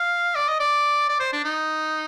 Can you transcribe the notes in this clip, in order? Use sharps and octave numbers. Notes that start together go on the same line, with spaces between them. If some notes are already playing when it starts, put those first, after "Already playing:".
Already playing: F5
D5
D#5
D5
D5
C5
D4
D#4